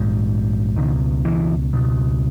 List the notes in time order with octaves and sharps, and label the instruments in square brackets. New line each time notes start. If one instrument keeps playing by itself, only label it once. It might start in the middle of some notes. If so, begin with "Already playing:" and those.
Already playing: [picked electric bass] A#1 G#2
C#2 B2 D#3
E3
C#2 B2